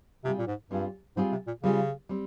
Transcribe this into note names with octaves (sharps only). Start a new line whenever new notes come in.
C3 G3 C4 F4 G#4
A#2
G#2
G2 G3 C4 F4 G#4
G#2 G3 C4 F4 G#4
C3
A#2
C#3 G3 C4 F4 G#4
G3 C4